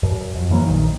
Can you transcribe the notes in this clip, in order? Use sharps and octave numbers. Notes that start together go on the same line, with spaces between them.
F#2
F2
E3 F#3 A#3
A#1 D#3